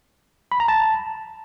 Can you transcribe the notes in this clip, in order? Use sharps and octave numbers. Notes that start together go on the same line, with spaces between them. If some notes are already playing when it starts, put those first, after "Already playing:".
B5
A#5
A5